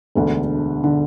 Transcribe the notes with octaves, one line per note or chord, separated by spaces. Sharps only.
E1 D2 D3
D3